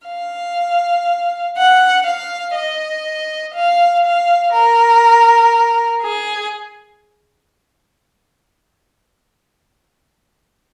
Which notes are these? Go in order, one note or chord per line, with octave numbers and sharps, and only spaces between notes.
F5
F#5
F5
D#5
F5
F5
A#4
G#4